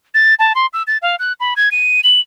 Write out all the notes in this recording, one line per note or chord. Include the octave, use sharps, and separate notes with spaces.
A6
A5
C6
E6
A6
F5
F#6
B5
G#6
D#7
F#7